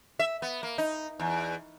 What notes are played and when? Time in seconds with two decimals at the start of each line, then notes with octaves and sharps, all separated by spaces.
0.19 E5
0.42 B3
0.63 A#3
0.78 D#4
1.20 E2